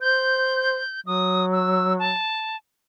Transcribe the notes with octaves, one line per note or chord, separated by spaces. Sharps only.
C5 G6
F#3 D#6
E6
A5